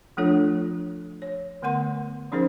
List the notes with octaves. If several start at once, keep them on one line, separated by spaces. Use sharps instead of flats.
F3 A3 D4 F4 A4 C#5
C#5
D3 A3 B3 A#4 F#5 C6
F3 C#4 D#4 G#4 A#4 C5